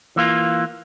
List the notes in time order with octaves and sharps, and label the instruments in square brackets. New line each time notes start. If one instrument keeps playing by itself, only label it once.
[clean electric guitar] E3 A#3 F4